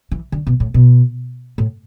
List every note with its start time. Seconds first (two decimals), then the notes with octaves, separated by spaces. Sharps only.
0.12 E3
0.32 D3
0.47 B2
0.60 A2
0.74 B2
1.58 A2